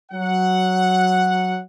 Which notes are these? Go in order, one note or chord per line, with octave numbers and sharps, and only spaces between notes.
F#3 F#5